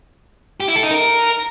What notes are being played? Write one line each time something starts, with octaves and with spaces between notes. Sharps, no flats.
G4
E4
A4
D#4
A#4